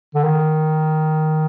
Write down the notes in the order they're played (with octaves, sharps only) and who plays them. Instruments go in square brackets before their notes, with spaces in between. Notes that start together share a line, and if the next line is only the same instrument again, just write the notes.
[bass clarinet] D3
D#3